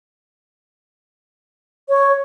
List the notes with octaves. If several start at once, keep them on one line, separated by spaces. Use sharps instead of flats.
C#5